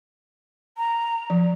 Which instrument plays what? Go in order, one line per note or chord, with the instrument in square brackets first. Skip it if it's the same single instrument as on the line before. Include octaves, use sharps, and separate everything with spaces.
[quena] A#5
[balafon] F3